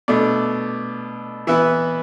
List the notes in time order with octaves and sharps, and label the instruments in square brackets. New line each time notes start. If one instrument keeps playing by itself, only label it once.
[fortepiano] B2 A3 D4 D5
E3 B3 E4 E5